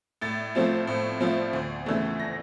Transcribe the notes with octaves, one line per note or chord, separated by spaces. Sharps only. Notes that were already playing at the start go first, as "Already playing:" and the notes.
A2 A6
F3 A3 C4 F4
A2
F3 A3 C4 F4
D2
C#3 E3 A3
A#6